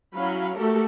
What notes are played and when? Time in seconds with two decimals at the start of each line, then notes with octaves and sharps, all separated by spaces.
0.14 F#3 C#4 E4 F5 B5
0.56 A3 F#4 G4 A4 A#4